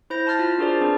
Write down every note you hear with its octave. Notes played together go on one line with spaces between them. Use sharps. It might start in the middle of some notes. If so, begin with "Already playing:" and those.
E4 C5 G6 A#6
A5 C6 F6 A6
F4
D4 F#4 G#4 A#4 C5 D5
C4 D4 G#4 B4